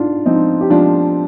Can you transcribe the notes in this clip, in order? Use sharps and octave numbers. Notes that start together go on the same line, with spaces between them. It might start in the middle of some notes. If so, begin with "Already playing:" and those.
Already playing: G#2 D4 F4
F3 C4 D#4
G4
F3 D4 F4